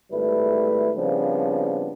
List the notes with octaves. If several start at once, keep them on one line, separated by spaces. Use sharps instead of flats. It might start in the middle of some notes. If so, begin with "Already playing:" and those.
G#1 G3 A3 E4 B4
C#3 F3 G3 B3 C4 D4